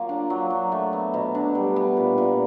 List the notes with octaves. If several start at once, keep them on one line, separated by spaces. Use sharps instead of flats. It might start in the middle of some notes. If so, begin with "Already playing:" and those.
Already playing: F#3 A#3 F4
D4
F#3
F#3
A3
B3
B2
D4
G3
B3
A#2
A#2